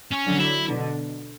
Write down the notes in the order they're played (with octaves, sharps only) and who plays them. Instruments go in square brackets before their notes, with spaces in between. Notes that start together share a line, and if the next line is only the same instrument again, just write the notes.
[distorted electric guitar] C#4
[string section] D3 F#3
[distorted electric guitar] E4
[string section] B2 D3